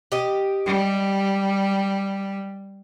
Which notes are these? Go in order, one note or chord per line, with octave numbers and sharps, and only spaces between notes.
G4 D#5
G3